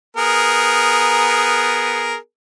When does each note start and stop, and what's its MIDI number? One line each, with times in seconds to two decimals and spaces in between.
0.17 2.16 59
0.17 2.16 68
0.17 2.16 70